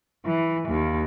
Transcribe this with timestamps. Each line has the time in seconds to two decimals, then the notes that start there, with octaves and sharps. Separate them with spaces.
0.25 E3
0.69 D#2